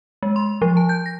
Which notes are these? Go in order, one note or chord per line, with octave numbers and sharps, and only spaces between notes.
G#3
C6
F3
A5
G6
A#6